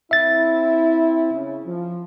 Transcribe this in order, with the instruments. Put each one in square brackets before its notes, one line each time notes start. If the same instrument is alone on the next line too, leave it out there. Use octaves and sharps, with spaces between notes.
[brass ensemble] C4 E4 [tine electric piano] E5 A6
[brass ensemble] C#3
F3